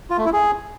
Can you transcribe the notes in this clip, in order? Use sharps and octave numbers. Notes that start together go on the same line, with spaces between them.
F4
A3
E4
G#4